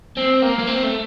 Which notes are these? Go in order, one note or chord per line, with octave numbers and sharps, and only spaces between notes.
C4
A#3
A#3
C4
A3